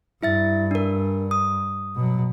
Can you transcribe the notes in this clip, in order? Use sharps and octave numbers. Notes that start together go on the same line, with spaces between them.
G2 E4 E5 A6
D4 A#4
D#6
B2 F#3